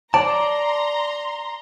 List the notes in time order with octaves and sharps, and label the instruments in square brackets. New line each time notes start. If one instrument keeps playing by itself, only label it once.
[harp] D5 [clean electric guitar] A5 [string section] A#5 C6